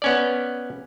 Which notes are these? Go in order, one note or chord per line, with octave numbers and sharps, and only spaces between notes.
B3 C#4 D5